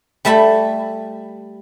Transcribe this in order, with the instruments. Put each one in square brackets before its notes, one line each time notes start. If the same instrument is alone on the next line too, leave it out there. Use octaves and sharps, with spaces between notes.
[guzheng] G3 A3 E5 B5